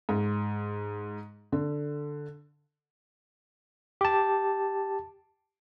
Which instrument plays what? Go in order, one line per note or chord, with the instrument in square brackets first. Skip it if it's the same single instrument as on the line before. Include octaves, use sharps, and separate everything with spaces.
[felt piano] G#2
D3
[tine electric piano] G4 A5